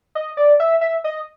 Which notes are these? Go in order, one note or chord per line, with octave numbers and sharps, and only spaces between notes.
D#5
D5
E5
E5
D#5